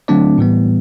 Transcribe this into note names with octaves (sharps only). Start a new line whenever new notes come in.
D3 F#3 A3 C4 D4 D5
A2 E3 G3 B3